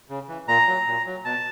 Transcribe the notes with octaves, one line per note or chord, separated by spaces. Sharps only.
C#3
E3
A#2 A#5
F#3
A#2
F#3
B2 A5